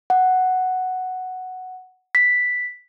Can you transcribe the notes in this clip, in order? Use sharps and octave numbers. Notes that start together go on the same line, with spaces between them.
F#5
B6